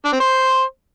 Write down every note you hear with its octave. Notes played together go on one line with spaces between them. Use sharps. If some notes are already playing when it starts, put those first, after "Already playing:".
D4
C4
C5